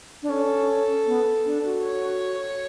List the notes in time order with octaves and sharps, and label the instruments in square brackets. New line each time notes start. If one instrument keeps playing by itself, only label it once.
[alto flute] D4
[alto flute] C#4 [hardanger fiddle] A4
[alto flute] B3
D4
F#4
[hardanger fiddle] C#5